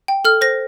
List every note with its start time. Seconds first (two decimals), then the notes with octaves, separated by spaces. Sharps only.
0.08 G5
0.25 A4 F6
0.41 C5 A#6